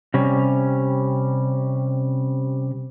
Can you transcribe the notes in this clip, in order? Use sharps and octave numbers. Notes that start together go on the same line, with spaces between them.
C3 G3 C#4